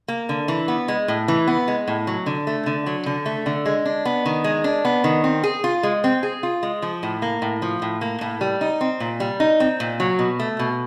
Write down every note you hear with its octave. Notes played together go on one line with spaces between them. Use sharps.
A#3
D3
E3
B3
G#3
A2
E3
B3
G#3
A2
F#3
D3
A3
D3
F#3
D3
A3
D3
G#3
D4
B3
D#3
G#3
D4
B3
D#3
C4
G#4
F4
G#3
C4
G#4
F4
G#3
F3
A2
A#3
A2
F3
A2
A#3
A2
G3
D#4
C4
A#2
G3
D#4
C4
A#2
F#3
B2
A3
B2